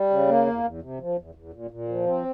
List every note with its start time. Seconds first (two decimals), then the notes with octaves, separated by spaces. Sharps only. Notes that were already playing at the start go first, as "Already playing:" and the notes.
Already playing: G3
0.10 C#3
0.28 A#3
0.46 E2
0.64 E2
0.82 C3
1.00 F3
1.18 E2
1.35 E2
1.54 A#2
1.71 A#2
1.89 F3
2.06 C4